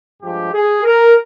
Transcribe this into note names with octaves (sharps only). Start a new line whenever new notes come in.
G2 F3 G#3 G4
G#4
A#4